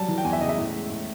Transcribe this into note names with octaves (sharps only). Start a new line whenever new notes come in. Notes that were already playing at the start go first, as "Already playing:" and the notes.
Already playing: F#3 G3 A5
E3
G5
E2 G#5
E5
C#3 D#5
E5
A2
G#3
A2